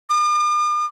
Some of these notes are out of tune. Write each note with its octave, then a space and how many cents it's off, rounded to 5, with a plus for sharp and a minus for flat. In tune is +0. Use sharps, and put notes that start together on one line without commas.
D6 +45